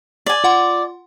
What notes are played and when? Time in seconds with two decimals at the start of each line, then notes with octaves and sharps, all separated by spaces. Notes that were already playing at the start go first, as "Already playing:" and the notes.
0.26 D5 G#5
0.44 F4 F#5 C6